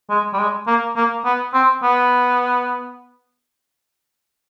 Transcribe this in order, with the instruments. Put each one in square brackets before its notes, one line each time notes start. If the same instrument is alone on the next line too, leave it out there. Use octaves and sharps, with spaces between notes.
[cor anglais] G#3
G3
G#3
A#3
A#3
B3
C4
B3